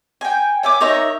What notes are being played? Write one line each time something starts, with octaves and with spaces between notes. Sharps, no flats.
G5 G#5
C#5 E5 G#5 D6
D#4 A#4 C#5 E5